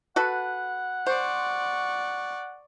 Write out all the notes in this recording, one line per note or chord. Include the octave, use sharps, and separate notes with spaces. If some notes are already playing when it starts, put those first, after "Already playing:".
F#4 A4 B4 F#5
C5 D5 C#6